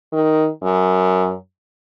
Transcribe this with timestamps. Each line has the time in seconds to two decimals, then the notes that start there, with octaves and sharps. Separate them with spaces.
0.13 D#3
0.63 F#2